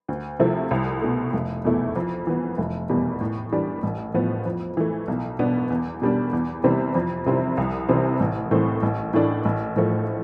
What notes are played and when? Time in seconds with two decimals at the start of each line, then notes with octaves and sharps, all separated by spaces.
0.08 D2
0.39 C3 F3 A3 E4
0.71 C2
1.02 B2 A3
1.33 F1
1.65 E2 B2 A3 E4
1.96 F2
2.27 E3 B3
2.58 F1
2.89 E2 B2 G3
3.21 A2
3.52 E3 G3 D4
3.83 A1
4.14 A2 F3 B3
4.45 F2
4.77 E3 A3
5.08 B1
5.39 B2 B3 D4
5.70 E2
6.02 B2 G3 D4
6.33 E2
6.64 C3 E3 G3 C4
6.95 F2
7.26 C3 G3 C4 E4
7.57 C2
7.89 C3 E3 G3 C4
8.20 A1
8.51 A2 E3 A3 C4
8.83 A1
9.13 A2 E3 A3 D4
9.45 A1
9.76 A2 F3 A3